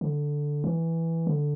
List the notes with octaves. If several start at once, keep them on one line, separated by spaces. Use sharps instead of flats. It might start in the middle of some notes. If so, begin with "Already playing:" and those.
D3
E3
D3